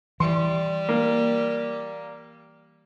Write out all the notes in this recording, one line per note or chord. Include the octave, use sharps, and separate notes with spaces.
E3 G3 C6
A#3